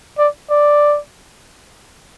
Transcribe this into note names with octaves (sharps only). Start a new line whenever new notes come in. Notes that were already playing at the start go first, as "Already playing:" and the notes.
D5
D5